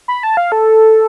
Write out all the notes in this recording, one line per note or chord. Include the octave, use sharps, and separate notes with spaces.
B5
A5
F5
A4